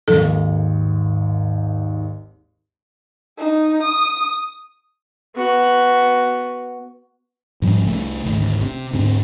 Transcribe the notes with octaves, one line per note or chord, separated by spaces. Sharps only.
G#1 D#2 G#2 A4
D#4
D#6
B3 F#4
G#2 F3 G3 C#4
C2 A3
G#1 D2
C3
D2 G#2 C4